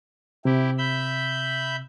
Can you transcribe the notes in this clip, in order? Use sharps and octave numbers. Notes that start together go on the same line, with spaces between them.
C3 E4 G4
E5 B5 G6